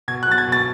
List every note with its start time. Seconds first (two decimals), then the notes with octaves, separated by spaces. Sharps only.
0.08 B2 G#6
0.23 F#6
0.28 F#3 A6
0.38 G#6
0.48 B2 A6